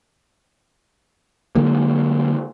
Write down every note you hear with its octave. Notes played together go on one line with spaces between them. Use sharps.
D3 F#3 G#3 A#3